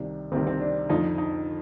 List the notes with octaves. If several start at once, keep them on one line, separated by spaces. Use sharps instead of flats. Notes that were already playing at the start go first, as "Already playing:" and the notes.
Already playing: C2 C3 D#3 D4
C2 C3 D#3 C4
C4
D4
F2 D3 F3 D#4
D#4